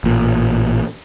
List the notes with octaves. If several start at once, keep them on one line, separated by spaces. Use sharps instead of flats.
A1 A#2